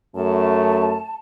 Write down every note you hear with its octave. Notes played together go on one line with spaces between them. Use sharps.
F#2 A3 A5